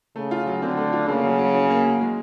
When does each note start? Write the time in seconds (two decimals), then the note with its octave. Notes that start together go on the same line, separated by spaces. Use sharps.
0.16 C#3 A3
0.31 F4
0.47 F#3
0.62 D3 C4
0.77 A3
0.92 F4
1.08 C#3 A#3
1.24 F#3
1.39 F#3
1.55 C#4
1.70 A#3
1.85 F#3
2.01 G#3